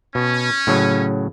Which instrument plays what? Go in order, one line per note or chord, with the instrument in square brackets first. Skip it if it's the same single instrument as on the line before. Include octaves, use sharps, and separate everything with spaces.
[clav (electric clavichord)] B2 [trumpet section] C#4
[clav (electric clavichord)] A2 C#3 F#3